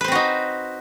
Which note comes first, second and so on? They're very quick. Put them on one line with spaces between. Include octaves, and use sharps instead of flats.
B4 C5 C4 F#4 D#4